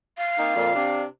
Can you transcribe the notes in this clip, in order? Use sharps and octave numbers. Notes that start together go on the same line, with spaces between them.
F5
A#3 C4 D#4
F2 A#2
C3 D4